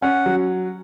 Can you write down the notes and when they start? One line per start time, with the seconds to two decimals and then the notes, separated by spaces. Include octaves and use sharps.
0.02 C#4 F#5
0.26 F#3